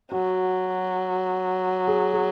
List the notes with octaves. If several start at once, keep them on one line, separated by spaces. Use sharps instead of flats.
F#3 F#4
G#4
G#4